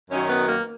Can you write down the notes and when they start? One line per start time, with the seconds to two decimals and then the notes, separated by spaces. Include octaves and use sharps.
0.11 F#2 D#3 F#3 C#4
0.30 B3
0.48 A#3